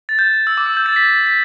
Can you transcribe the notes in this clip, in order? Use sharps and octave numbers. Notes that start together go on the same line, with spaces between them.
A6
G6
G6
E6
D6
E6
G6
A6
B6
B6